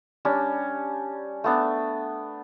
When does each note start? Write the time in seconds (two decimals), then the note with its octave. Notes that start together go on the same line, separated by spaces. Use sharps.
0.25 G3 C#4 D4
1.44 A3 B3 D4